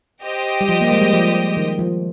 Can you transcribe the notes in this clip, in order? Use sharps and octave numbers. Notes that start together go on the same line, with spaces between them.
G4 C5 D#5 G5
G3
F3
A#3
G#3
G3
F3
D#3
F3